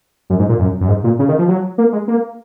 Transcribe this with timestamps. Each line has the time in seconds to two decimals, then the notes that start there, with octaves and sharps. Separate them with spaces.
0.30 F#2
0.39 G#2
0.49 A#2
0.59 F#2
0.81 F#2
0.88 G#2
1.04 A#2
1.19 C#3
1.28 D#3
1.38 F3
1.48 F#3
1.78 A#3
1.92 G#3
2.08 A#3